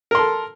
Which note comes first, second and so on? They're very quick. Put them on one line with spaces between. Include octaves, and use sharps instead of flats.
A#4 C6 A4